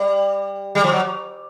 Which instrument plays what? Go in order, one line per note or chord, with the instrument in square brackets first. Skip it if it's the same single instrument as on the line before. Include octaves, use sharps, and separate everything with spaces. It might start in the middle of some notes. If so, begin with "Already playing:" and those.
Already playing: [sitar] G3
G3
F3
F#3